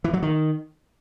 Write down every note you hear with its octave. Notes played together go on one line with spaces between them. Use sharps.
E3
F#3
D#3